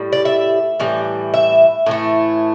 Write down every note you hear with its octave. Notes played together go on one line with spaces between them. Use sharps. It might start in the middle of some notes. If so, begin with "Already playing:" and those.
Already playing: A2 G3
D5
E5
A2 E3 G3
E5
A2 E3 A3